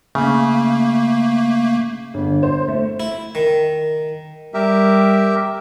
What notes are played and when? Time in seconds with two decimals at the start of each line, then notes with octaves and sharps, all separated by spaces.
0.15 C#3 A3 A#3
2.14 G1
2.43 C5
2.68 A3
3.00 E4
3.35 D#3
4.54 G3 G4 A#4 E5